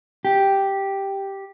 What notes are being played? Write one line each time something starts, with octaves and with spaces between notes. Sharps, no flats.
G4